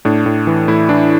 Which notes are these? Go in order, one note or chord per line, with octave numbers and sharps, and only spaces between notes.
A2 D4
A2
E3
A2 E4
E3 D4